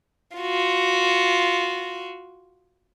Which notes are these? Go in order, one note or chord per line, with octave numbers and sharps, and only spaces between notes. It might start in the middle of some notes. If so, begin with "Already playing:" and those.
F4 F#4